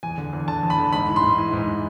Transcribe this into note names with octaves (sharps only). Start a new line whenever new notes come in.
E2 G#5
D3
E2
D3 A5
E2
B5
D3
G#2 B5
E3
C6
G#2
E3
G#2
E3